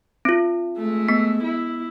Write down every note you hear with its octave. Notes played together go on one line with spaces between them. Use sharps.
C4 F4
G#3 A3
B3 B6
E4